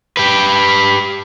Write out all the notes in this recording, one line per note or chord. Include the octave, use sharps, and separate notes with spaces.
G4 B4